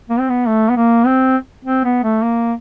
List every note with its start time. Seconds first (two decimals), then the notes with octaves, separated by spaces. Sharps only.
0.10 A#3
0.19 C4
0.29 B3
0.48 A3
0.70 B3
0.77 A#3
1.06 C4
1.65 C4
1.84 B3
2.03 A3
2.23 A#3